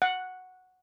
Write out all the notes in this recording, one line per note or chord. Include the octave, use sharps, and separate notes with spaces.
F#5